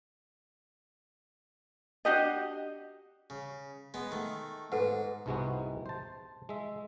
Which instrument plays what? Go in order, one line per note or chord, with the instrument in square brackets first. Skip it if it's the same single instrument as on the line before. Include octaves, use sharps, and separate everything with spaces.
[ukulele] D4 F#4 G4 D#5
[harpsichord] C#3
G#3 B3
D#3 A3
[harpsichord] G#2 [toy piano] A4 B4 F#5
[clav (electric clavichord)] C2 G#2 C3 G#3 B3 F#4
C5 A5
G#3 E5